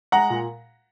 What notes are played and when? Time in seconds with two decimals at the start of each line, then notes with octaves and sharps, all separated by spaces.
0.12 G#3 F#5 A#5
0.30 A#2